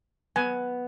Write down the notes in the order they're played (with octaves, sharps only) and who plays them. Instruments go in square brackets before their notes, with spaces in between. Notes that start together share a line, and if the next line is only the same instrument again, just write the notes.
[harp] B3 [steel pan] G#5